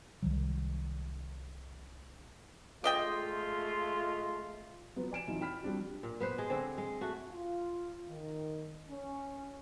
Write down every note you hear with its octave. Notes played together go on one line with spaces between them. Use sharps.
C2 D#3 F#3
G#3 A3 F4 D5 D#5 G5
F3 F#3 B3
D5 G#5 D7 E7
F2 E3 F#3 D#4 F4
G5 B5 F6 B6
F3 G3 C4 D4 F#4
A#2
B3 B4 C5
G#3 G#4
D3 C4
G#3
A3 F#4
F4
D#3
C#4